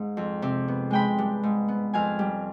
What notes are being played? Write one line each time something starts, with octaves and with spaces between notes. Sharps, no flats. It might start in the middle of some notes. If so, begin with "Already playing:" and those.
Already playing: G#2 F5
F2
C3
B3
G#3 G5 B5
G2
G#2
B3
F2 F5 G#5
G3